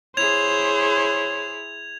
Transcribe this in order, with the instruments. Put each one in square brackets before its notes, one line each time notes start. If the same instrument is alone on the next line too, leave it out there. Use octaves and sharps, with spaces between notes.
[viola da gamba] E4 G#4 [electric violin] C5 [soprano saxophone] C#5 [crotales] G#6 F7